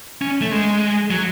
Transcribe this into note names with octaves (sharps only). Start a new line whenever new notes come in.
C#4
A3
G#3
F#3